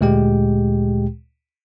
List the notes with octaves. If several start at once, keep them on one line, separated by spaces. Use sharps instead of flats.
D2 A#2 G#3 G4 G5